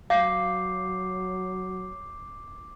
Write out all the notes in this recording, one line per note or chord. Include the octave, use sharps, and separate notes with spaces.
F#3 F5 D6 G6 C7